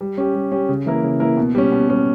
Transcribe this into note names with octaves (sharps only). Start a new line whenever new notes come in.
G3
C#4 G4
G3
C#4 G4
C#3
E3 A#3 E4 A#4
C#3
E3 A#3 E4 A#4
B2
G3 C#4
B2
G3 C#4